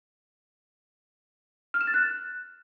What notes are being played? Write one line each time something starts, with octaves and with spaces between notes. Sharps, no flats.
F6
E7
A6
F#6